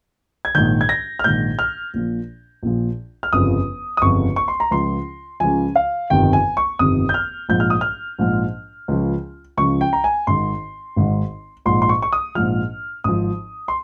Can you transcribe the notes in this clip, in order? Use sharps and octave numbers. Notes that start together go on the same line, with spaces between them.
G#6
A#1 G#2 D#3 G6
G#6
A#6
F6
A#1 G#2 D#3 G6
F6
A#1 A#2 F3
A#1 A#2 F3
F6
G1 F2 C#3 F3 D#6
D#6
G1 F2 C#3 F3 C#6
C#6
C6
A#5
C#2 C#3 F3 C6
C#2 C#3 F3 G#5
F5
G1 F2 C3 D#3 G5
G#5
C#6
G1 F2 C3 D#3 D#6
G6
F6
A#1 G#2 F3 G6
F6
D#6
F6
A#1 G#2 F3
C#2 C#3 F3
C#2 C#3 F3 C#6
G5
A#5
G#5
G#1 G#2 D#3 C6
G#1 G#2 D#3
A#1 G#2 F3 C6
C6
C#6
C#6
D#6
A#1 G#2 F3 F6
G#1 G#2 F3 D#6
C6